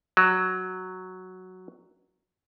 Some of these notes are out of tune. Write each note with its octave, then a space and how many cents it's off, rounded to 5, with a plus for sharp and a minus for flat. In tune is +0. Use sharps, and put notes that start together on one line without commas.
F#3 +0